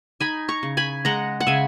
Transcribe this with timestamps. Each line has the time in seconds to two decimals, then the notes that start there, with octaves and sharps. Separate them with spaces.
0.20 D#4 G#5 B5
0.49 A#5 C#6
0.63 C#3
0.77 G#5 B5
1.05 G#3 F#5 A#5
1.40 F#5
1.47 C#3 E5 G#5